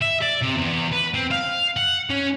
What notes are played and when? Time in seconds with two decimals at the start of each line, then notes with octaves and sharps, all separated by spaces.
0.02 E5
0.22 D5
0.42 C3
0.57 E2
0.92 B4
1.14 C4
1.31 F5
1.77 F#5
2.10 C#4